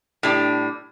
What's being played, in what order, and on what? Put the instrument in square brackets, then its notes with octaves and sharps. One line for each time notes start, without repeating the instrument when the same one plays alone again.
[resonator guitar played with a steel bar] A2 G3 D4